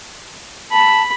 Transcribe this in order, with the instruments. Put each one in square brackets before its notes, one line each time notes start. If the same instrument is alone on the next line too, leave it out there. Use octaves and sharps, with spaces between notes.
[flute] A5 [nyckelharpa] B5